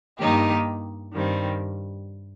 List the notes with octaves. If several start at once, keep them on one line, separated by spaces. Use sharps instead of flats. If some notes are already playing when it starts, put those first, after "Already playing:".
G2 D#3 A#3 D#4 G4
G2 D#3 G3 C4